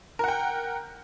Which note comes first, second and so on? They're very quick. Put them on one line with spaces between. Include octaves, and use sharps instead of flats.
A#4 F#5 G5